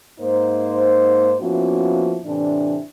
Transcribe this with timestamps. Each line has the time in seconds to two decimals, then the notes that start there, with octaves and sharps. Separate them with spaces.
0.20 G#2 A#3 D#4 C5
1.41 F3 A#3 B3 C#4 E4 F#4
2.25 A2 C3 E3 D4